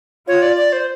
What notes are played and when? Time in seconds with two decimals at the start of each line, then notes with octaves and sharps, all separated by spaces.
0.27 F4 C#5
0.42 D5
0.57 D5
0.73 C5